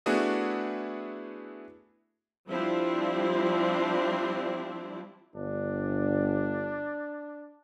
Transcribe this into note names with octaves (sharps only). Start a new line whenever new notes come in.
A3 B3 D4 E4 F#4 G#4
F3 G3 C4 D4 E4
G1 D4